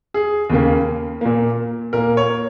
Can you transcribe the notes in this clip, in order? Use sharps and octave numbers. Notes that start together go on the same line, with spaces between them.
G#4
D#2 C#3 A#3
A#2 A#3
A#2 A#3 A#4
C#5